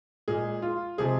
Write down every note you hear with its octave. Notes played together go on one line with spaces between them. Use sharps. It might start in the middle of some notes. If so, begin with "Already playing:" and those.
A#2 G#3 G#4
F4
C3 F3 G#3 G#4